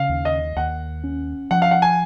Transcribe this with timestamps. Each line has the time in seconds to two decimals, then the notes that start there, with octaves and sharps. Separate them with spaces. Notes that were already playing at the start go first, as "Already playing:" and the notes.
Already playing: C#3 F5
0.09 D#2
0.25 D#5
0.56 D#2 F#5
1.04 C#4
1.51 F3 F#5
1.62 F5
1.71 F#5
1.82 G#5